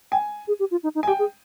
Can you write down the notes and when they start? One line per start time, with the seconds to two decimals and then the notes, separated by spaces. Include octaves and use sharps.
0.12 G5 G#5
0.48 G#4
0.59 G4
0.71 F4
0.83 D#4
0.95 D#4
1.03 G#5
1.07 G4 G5
1.19 G#4